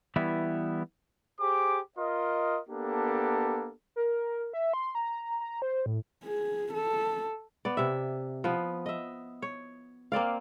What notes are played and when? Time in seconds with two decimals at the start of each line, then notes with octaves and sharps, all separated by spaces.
0.16 E3 G3 B3 E4
1.40 G4 G#4 C5 D6
1.98 F4 A#4 D#5
2.69 A#3 B3 D4 G4 A4
3.96 A#4
4.53 E5
4.74 C6
4.95 A#5
5.40 A#5
5.62 C5
5.86 A2
6.24 G#4
6.73 A4
7.65 B3 D5
7.77 C3 E5
8.44 F3 B3
8.86 D#5 E5
9.42 C#5
10.12 A#3 C4 D5 F5